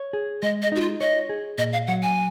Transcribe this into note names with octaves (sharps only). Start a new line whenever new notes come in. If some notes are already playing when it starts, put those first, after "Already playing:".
Already playing: C#5
G#4
G#3 D#5
D#5
D#4 F#4
F4
C#5 D#5
G#4
A#2 D#5
F5
F#3 F#5
G#5